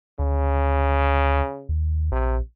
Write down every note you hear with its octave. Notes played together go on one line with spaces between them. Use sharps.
D2 C#3
D#2
A#1 C3